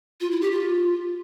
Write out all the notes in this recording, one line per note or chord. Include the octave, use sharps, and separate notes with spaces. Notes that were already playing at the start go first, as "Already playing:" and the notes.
F4
E4
G4
F4